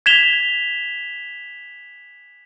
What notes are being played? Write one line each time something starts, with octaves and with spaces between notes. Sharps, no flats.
G#6 B6 E7 F7 G7